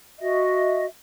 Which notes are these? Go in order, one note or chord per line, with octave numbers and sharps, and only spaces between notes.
F#4 D#5 E5